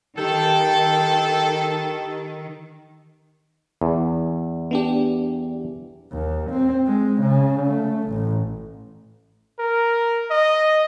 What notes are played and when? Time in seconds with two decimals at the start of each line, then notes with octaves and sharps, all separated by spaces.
0.18 D#3 G4 A4 G5
3.82 E2
4.71 B3 D4 G4
6.12 D#2
6.50 C4
6.87 G#3
7.21 C#3
7.66 A3
8.09 A1
9.59 A#4
10.31 D#5